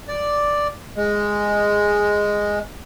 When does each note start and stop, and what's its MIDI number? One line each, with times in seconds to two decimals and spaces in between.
0.08 0.68 74
0.96 2.59 56